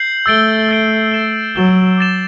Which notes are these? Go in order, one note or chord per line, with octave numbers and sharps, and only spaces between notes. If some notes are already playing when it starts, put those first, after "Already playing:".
Already playing: G6 C7 F#7
A3 E6 A6 D7 G7
E6 A6 D7 G7
A6 E7 G7
F#3 A6 E7 G7
D6 A6 E7 G7